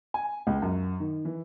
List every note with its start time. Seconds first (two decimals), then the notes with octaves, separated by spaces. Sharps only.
0.14 G#5
0.47 C#2
0.62 F#2
1.00 D#3
1.25 E3